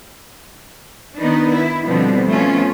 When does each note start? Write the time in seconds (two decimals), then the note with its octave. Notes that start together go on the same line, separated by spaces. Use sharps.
1.19 D#3 B3 D4 D#4 B4
1.51 E4
1.86 B2 D3 F3 G3 B3 C4
2.29 F3 A3 B3 C#4 F4